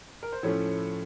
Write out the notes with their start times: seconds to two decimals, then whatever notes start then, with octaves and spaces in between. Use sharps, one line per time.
0.23 A#4
0.32 C5
0.43 A2 F3 A3 C#4 C#5